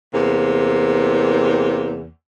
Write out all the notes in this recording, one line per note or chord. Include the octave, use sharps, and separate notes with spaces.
E2 C3 A#3